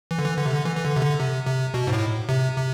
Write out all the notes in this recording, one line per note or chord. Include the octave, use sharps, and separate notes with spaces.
E3
D3
E3
D3
C3
D3
E3
E3
D3
C3
D3
C3
C3
B2
G#2
A2
C3
C3